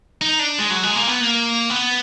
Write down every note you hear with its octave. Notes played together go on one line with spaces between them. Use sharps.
D#4
D4
G#3
F#3
G#3
A#3
B3
A#3
B3